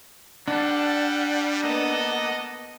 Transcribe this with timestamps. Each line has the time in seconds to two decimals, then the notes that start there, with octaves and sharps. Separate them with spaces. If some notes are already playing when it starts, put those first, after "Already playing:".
0.48 G3 D4 A4 F#5
1.63 A#3 B3 A4 D#5 F#5